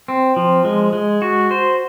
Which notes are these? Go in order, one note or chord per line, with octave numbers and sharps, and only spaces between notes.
C4
F3
G#3
G#3
F#4
C5